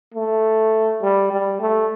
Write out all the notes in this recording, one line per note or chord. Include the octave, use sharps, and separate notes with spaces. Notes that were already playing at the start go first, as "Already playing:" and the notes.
A3
G3
G3
A3